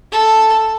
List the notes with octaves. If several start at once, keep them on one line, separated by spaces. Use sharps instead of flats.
A4